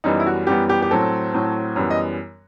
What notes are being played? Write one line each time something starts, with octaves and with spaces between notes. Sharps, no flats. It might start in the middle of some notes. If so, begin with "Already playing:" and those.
F#2 E3 G3 B3 D#4
E4
F#4
F#2 E3 G3 B3 G4
G4
G4
A2 F#3 C4 A4
A2 F#3 C4
F#2 E3 G3 B3
D#5